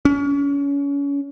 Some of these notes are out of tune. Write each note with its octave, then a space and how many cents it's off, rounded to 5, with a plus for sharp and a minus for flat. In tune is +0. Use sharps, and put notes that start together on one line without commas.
C#4 +30